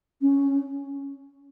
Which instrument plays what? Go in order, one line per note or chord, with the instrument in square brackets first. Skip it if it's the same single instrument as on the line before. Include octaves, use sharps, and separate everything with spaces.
[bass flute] C#4